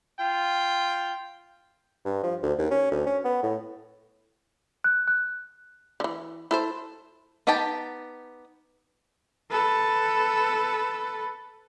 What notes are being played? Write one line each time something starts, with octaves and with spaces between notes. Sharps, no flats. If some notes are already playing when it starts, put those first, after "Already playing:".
F4 G5
G2
F3
D2
D#2
C#4
D2
C#4
B3
A2
F#6
F#6
D3 E3
E4 A4 C5
B3 D#4 G4 G5 A5
A4 B4